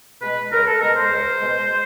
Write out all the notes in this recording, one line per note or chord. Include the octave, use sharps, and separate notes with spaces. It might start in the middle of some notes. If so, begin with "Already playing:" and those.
B2 G#3 B4
C#2 A#4
A4
B2 G#3 A#4
C5
C#2
B2 G#3